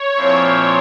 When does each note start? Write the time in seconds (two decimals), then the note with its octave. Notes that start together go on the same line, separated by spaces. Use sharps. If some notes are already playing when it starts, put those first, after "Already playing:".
Already playing: C#5
0.16 A#2 F3 C4 E4